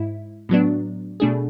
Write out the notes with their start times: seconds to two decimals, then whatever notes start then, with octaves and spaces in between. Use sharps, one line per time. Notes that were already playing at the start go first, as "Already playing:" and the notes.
Already playing: G#2 E4
0.49 A2 F#3 B3 D4
1.20 B2 A3 D4 G#4